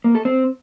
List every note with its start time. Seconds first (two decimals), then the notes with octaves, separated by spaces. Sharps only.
0.04 A#3
0.15 A4
0.25 C4